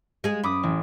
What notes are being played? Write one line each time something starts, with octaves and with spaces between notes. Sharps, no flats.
G#3 G#4
F#2 B5 D6 D#6
A1